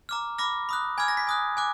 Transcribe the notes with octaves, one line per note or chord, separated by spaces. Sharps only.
A#5 D6 F6
B5 D6 F6 A#6
B5 D#6 F#6
G#5 B5 D6 F6 G#6
A#6
B6
G#5 D#6 F#6
G#5 D6 F#6